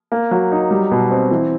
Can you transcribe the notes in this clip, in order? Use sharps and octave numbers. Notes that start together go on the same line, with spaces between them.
A#3
F#3
D#4
G3
B2
C4
E3